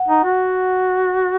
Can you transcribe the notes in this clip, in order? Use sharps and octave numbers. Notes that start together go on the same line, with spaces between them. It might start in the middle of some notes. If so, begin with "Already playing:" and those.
Already playing: F#5
D#4
F#4